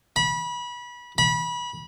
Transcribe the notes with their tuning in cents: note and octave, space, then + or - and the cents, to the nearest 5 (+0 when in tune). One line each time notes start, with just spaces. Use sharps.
B5 -25
B5 -25